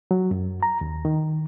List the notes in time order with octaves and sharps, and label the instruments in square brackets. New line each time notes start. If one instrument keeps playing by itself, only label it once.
[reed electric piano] F#3
F#2
A#5
D#2
D#3